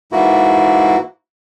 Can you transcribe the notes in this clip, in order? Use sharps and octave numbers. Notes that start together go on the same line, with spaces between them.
G#2 E3 A#3 E4 F#4